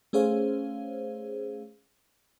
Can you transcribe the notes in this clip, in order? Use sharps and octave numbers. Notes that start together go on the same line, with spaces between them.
A3 C#4 G#4 C5 C#5 F5